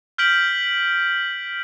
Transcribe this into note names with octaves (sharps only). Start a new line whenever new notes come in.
F6 G6 B6 D7 F#7